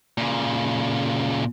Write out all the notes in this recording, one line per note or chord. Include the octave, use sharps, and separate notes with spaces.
A#2 C#3